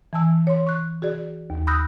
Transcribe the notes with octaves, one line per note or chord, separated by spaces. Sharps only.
E3 G#5 A5 E6
C#5 C6
C#6 F#6
F#4 G#4 D5
D#2
B5 D#6 E6 F#6 G6 A#6